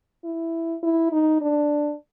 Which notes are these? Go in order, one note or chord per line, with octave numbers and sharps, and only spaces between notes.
E4
E4
D#4
D4